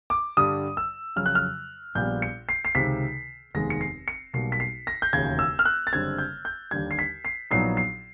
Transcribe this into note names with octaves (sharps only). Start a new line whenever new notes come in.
D6
G2 D3 G3 D#6
E6
F2 C#3 F#3 F6
F#6
F6
A#1 A#2 G3 B3 G6
C#7
C7
C7
C#2 C3 D#3 B6
F1 D#2 D#3 G#3 B3 A#6
C#7
C7
C#7
B1 B2 G3 A#3 C7
B6
C7
A#6
G6
E1 D#2 C#3 G#6
E6
F6
F#6
A6
F#1 F#2 D3 G3 C4 G#6
G6
G6
D#2 D3 G3 G#6
C7
B6
C7
A#1 A#2 F#3 B3 D#4 C7
C7